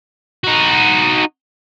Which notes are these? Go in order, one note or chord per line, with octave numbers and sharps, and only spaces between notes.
D#4 F#4